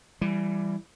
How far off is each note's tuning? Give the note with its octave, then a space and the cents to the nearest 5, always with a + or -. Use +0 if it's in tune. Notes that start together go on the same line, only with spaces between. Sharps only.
E3 +25 G3 +5